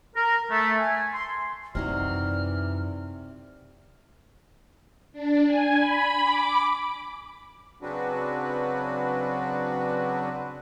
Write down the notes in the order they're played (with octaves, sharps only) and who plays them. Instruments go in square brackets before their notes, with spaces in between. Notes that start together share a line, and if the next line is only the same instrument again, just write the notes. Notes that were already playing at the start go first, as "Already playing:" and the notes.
[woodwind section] A#4
A3
G#5
C6
[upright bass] F#2 [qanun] C3 D#4 F#4 [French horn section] E3 D5 [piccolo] F6
[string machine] D4
G#5
B5
D6
[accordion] C#3 F#3 C4 D4 F#4 B4